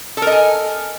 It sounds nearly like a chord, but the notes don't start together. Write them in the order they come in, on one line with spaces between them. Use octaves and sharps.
A4 A#4 D#5 G#5